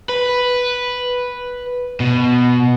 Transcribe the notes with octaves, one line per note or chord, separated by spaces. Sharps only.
B4
B2